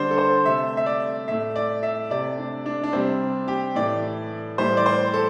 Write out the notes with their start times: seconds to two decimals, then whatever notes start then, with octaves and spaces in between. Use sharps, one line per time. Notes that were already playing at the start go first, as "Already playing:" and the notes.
Already playing: D3 G3 D4 C5
0.11 A4
0.18 C5
0.45 C3 A3 E5
0.77 E5
0.86 D5
1.28 A2 A3 E5
1.56 D5
1.83 E5
2.11 C3 A3 D5
2.38 D4
2.66 D4
2.83 D4
2.93 C3 G3 C4
3.48 G4
3.75 A2 E3 A3 D5
4.58 A2 E3 G3 C5
4.77 D5
4.86 C5
5.14 A4